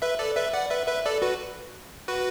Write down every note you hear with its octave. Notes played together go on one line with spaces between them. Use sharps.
B4 E5
A4 D5
B4 E5
D5 F#5
B4 E5
B4 E5
A4 D5
F#4 B4
F#4 B4